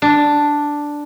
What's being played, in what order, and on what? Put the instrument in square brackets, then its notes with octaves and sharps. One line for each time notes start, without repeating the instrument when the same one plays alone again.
[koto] D4